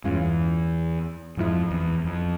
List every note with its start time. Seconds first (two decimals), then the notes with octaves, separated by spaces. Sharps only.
0.04 E2 G2 E3 G#3 C#4 F4
1.37 F2 G#2 F3 G#3 E4
1.71 E2
2.04 F2